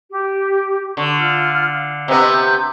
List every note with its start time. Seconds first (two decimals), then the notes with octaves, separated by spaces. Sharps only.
0.10 G4
0.97 D3 C#6
1.19 F4 F6
1.74 F5
2.08 C3 B3 C5 D#5
2.32 G6